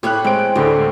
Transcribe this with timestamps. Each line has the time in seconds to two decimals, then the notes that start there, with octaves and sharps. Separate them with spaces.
0.03 A2 G4 C#5 B5 F#6
0.25 G#3 C4 G5 D7
0.56 D2 A2 D3 G4